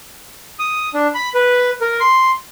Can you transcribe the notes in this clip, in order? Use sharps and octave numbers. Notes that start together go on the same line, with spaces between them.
D#6
D4
B5
B4
A#4
C6